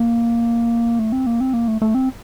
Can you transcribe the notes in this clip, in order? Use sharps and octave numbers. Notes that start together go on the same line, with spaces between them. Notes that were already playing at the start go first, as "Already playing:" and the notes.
Already playing: A#3
A3
C4
A#3
C4
A#3
A3
A3
C4